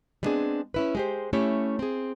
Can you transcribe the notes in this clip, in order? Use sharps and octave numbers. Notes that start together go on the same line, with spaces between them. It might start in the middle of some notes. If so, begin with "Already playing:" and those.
G3 G#3 B3 C4 D4 G#4
C#4 E4 B4
G#3 G4 C5
A3 C#4 E4 G4 C#5
C4 G#4